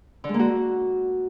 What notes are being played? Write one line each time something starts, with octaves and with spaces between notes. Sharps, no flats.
D3
G#3
A#3
F#4